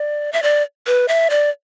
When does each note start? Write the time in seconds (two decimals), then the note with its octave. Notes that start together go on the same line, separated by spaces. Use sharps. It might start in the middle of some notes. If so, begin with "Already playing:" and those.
Already playing: D5
0.33 E5
0.43 D5
0.87 B4
1.08 E5
1.30 D5